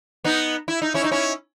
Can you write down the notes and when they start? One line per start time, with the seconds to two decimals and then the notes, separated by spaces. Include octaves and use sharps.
0.24 B3 D#4
0.68 E4
0.82 D#4
0.94 C#4 E4
1.04 D#4
1.12 C#4 E4